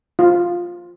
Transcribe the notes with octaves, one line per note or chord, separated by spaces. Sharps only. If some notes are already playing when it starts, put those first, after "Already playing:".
F4